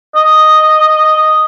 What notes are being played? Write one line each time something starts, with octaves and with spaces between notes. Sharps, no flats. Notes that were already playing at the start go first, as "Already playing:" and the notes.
D#5